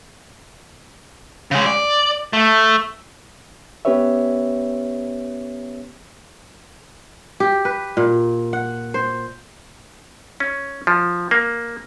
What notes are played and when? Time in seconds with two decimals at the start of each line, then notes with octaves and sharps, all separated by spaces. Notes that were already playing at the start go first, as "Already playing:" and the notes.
1.51 C#3 G#3
1.66 D5
2.33 A3
3.85 B3 C#4 G4 B4 C#5 E5
7.40 G4
7.65 B4
7.97 A#2
8.53 F#5
8.94 C5
10.40 C#4
10.87 F3
11.31 A#3